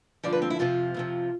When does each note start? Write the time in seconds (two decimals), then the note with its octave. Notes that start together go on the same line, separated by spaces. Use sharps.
0.23 G2 D3 F3 D5
0.32 B4
0.42 C4
0.50 E4
0.59 F2 C3 F3 F4
0.94 F2 C3 F3